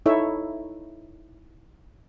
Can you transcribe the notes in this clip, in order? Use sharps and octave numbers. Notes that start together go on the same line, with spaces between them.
D#4 E4 A4 C#5 E5